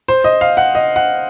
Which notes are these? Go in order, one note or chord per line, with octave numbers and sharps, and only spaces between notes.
C5
D#5
F5
F#5
D#5
F#5